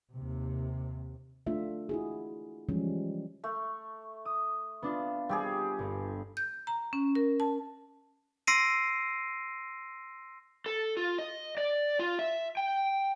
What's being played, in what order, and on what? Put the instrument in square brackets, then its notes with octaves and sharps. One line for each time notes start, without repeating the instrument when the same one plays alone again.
[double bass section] D#2 C3
[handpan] A3 D4 F4 E5
E4 F#4 G#4
E3 F3 G3 G#3 C#4
[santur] A3
[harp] D#6
B3 D4 F4
[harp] G3 [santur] C4 G4 G#4
[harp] G1
[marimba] G6
A#5
C#4
A#4
A5
[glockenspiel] C6 E6 A#6 C7 D7 D#7
[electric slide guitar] A4
F4
D#5
D5
F4
E5
G5